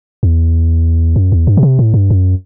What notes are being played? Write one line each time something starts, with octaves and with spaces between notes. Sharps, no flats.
E2
F#2
E2
G2
B2
C3
A2
G2
F#2